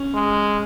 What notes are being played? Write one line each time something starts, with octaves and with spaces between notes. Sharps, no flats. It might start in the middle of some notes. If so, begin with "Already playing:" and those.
Already playing: C#4
G#3